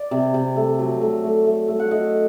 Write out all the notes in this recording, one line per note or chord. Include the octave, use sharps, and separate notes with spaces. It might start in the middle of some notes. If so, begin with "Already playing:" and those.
Already playing: D5
C3
C3
A3
F#3
A3
A3
A3
A3
F#5
A3 D#5